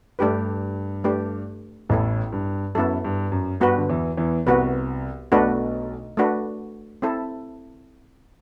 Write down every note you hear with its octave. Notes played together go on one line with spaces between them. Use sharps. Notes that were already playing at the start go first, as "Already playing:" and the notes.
G2 A3 D4 G4 B4
A3 D4 G4 B4
A1 A2 B3 E4 A4
G2
F#2 B3 E4 A4
G2
F#2
G2 B3 F#4 B4
D3
E2 E3
E2 E3
C2 C3 B3 F#4 B4
B1 B2 A3 D4 F#4 B4
A3 D4 F#4 B4
C4 E4 A4 C5